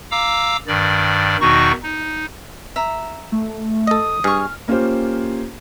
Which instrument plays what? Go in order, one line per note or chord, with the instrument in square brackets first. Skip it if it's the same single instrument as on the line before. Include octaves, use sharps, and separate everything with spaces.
[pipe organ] F5 A#5 D6 E6
G2 D#3 D5
E2 B2 D#3 D#4 F#4 C#6
D#4
[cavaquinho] E5 A#5
[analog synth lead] A3
[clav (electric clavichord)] A4 D#5 [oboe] D#6
[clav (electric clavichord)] G2 [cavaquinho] G#4 C#6 [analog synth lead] F6
[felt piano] A#3 C#4 F4 G4 C5